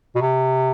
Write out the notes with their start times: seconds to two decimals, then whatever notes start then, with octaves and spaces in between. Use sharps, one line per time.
0.16 B2
0.21 C3